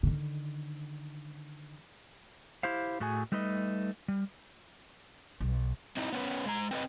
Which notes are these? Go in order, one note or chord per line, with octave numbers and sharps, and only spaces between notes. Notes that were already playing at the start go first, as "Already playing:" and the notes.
D3 D#3
E4 G4 C5 F5
A2 A3 F#4 G#4 G#5
G3 A3 D#4 B4 D#5
G3
B1
C4 D#4 E4
B3 C#4 B4
G#3 A#5
C4 B4 D#5